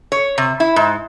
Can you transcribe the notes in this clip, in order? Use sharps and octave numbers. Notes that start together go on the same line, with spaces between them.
C#5
C3
E4
G#2